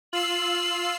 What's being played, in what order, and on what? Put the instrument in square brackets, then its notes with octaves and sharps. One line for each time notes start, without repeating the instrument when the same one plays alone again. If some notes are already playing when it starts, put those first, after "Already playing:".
[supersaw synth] F4 E6 C7 [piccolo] F#7